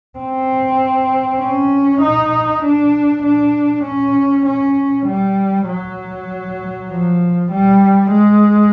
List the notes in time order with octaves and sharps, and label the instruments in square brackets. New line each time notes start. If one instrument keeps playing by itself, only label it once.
[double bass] C4
C#4
D#4
D4
D4
C#4
C#4
G3
F#3
F3
G3
G#3